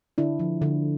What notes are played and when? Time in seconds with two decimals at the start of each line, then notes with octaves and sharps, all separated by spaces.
0.18 D3 D4 E4
0.40 F3
0.62 D3